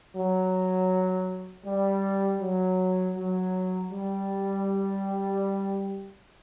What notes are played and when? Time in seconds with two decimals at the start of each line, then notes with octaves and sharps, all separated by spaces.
0.15 F#3
1.65 G3
2.41 F#3
3.16 F#3
3.92 G3